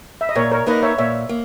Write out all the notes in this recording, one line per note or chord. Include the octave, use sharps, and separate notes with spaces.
E5
D#5
A#2 A#4 C#5
A#4 C#5
A#3 D#4 A#4 B4 D#5
C#5 E5
A#2 C#5 E5
A#3